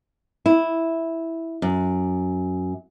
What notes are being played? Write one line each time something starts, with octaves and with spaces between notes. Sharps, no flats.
E4
F#2